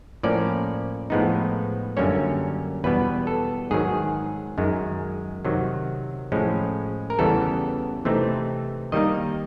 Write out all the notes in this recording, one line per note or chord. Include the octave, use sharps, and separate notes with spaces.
A2 F3 A#3 C#4 D5
A2 F3 G#3 B3 D#4
F#2 D3 G3 A#3 C#4 C#5
E2 B2 G3 B3 B4
A4
G#2 D#3 F#3 G#4
F#2 D#3 G#3
C3 D#3 F#3
A2 F3 G#3 C#4
A#4
E2 C#3 E3 G3 B3 A4
C3 E3 A3 C4 D#4
D#3 G3 A#3 D#4 D#5